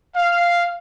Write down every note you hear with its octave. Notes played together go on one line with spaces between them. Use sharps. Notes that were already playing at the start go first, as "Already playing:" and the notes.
F5